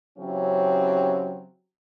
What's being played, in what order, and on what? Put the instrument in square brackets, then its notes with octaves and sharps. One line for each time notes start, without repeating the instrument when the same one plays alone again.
[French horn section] C#3 E3 F#3 C4 C#4 G4